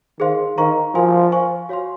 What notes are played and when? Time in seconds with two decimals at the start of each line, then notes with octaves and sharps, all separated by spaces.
0.20 D#3 G#4 C5 F5 C6
0.58 D#3 C5 F5 A#5 C#6
0.95 F3 F#4 A#4 F5 G#5 C6
1.32 C5 F5 G#5 C#6
1.69 F#4 C#5 F5 C6